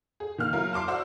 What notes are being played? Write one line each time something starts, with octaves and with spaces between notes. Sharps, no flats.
G#4
D#3 A#3 F6
F#3 E4 A#4 F5
A5 C6 D6 C7
F#4 C5 D5 E5 F#5 E6